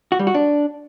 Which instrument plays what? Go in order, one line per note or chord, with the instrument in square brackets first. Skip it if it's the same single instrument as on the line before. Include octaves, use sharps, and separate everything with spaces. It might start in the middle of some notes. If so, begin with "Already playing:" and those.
[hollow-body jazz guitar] F#4
G3
F#4
D4